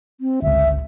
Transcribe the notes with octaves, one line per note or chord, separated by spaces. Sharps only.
C4
G1 C#2 E5